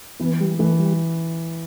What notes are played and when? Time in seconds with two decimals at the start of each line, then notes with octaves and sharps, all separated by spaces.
0.20 E3 B3
0.40 G3
0.59 E3 A3
0.79 G3